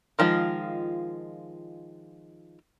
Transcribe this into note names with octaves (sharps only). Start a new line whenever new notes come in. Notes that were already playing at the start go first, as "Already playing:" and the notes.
D#3 F3 G#3 F4